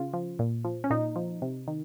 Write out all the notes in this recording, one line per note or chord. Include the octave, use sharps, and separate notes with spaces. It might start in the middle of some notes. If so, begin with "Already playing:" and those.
Already playing: C#3 F4
F3
A#2
F3
C#4
A#2 D#4
F3
C3
D#3